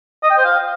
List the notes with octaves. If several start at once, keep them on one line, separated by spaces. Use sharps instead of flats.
D#5
G5
C5
F5